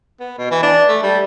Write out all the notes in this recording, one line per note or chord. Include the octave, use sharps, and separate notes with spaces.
B3
B2
E3
D4
A3
G3